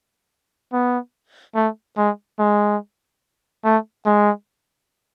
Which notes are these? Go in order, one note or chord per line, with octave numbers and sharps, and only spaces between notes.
B3
A3
G#3
G#3
A3
G#3